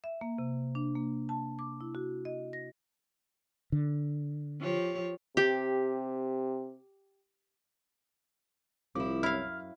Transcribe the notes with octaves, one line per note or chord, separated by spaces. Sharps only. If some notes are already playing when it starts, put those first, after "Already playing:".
E5
A#3
C3
D4
A#3
A5
D6
E4
F#4
D#5
A#6
D3
F3 G4 C#5
C3 G4
C2 F3 E4 D6
F#2 E4 F5 F6